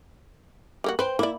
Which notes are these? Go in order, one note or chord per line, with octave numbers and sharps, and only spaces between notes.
G3 A#3 F#4
B4 C5 G5
A#3 E4 D5